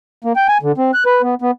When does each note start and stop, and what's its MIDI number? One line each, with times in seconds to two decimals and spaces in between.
0.24 0.33 58
0.36 0.47 79
0.48 0.58 80
0.62 0.72 50
0.78 0.91 60
0.94 1.04 90
1.06 1.22 71
1.23 1.35 59
1.42 1.51 59